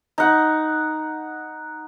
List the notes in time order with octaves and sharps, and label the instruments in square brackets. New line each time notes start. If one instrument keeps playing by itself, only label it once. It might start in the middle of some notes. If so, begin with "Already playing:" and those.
[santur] D#4 F#5